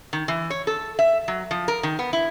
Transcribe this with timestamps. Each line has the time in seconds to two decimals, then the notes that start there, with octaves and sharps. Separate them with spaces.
0.13 D#3
0.28 E3
0.50 C#5
0.67 A4
0.99 E5
1.28 F#3
1.51 F3
1.68 A#4
1.83 D#3
1.99 B3
2.13 E4